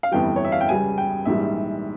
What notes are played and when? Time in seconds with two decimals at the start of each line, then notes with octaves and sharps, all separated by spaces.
0.03 F5
0.12 G1 F2 E3 G3 G5
0.36 C#5
0.45 E5
0.52 F5
0.61 G5
0.69 C#2 C#3 G3 G#5
0.98 G5
1.25 A#1 G#2 E3 G3 E5